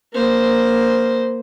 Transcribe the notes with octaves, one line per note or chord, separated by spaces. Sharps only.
A#3 C5